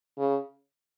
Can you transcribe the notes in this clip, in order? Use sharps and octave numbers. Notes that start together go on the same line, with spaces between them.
C#3